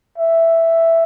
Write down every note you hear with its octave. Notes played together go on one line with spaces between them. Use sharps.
E5